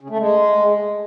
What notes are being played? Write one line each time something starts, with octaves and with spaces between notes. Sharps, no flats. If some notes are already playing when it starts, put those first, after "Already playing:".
C#3
A3
G#3